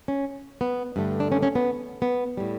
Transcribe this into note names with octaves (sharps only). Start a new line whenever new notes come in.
C#4
B3
G2 D3 A3
D4
C#4
C#4
B3
B3
A2 G3